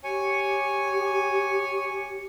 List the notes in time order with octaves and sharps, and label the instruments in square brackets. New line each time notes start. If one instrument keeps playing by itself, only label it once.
[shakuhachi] G4 [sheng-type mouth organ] C#5 G#5